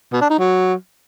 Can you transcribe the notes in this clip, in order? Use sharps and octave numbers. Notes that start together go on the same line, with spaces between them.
B2
D4
D#4
F#3